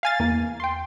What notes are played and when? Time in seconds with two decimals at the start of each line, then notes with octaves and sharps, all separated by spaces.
0.03 F5 G#5 A6
0.20 E2 A#3
0.60 G5 C6